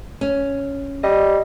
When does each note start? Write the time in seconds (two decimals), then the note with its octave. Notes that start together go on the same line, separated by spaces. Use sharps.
0.21 C#4
1.03 G3 D#5